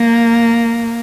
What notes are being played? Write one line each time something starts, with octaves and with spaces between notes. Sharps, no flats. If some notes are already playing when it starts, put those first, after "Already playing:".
Already playing: A#3